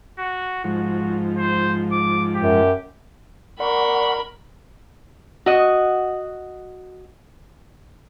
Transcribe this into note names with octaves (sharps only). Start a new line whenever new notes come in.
F#4
G#2 F3 F#4
C5
D6
F#2 G4
A#4 D5 F#5 B5 C#6
F#4 D#5